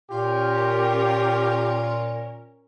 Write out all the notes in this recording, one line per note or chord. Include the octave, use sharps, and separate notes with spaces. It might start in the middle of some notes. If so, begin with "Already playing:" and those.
A#2 C#4 F4 G4 A#4